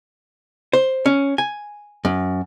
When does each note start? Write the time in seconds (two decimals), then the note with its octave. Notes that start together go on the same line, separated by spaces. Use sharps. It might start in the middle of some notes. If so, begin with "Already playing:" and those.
0.73 C5
1.06 C#4
1.38 G#5
2.05 F#2